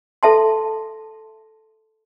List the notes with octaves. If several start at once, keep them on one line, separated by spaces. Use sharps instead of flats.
A4 E5 A5 C6